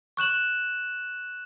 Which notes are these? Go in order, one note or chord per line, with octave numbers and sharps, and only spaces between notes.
C#6 F#6 E7 F#7